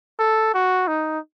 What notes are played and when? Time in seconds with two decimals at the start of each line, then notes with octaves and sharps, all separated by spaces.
0.19 A4
0.54 F#4
0.88 D#4